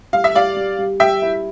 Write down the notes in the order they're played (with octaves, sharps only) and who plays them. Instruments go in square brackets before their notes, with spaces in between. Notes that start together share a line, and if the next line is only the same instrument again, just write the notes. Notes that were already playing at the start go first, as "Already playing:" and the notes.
[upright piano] G3 [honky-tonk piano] F5
[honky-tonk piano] E5
[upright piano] G3 [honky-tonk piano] D5 F5
[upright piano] G3
G3
[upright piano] G3 [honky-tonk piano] E5 G5
[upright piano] E4